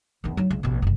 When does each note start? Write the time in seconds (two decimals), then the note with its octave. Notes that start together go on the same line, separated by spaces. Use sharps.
0.24 E2 D#3
0.37 F#3 D#4
0.51 C#2
0.63 A1 B2
0.82 F#1 C2